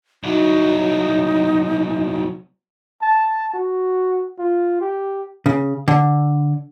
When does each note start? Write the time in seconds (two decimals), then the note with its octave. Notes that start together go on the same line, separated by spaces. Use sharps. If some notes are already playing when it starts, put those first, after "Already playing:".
0.24 C2 F#3 D#4
3.02 A5
3.54 F#4
4.39 F4
4.81 G4
5.46 C#3
5.88 D3